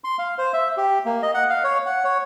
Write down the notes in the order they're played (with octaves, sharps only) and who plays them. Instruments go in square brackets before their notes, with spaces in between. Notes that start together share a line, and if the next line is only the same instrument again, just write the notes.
[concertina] C6
F5
C5
E5
G4
A#3
D#5
F#5
F5
C#5
F#5
C#5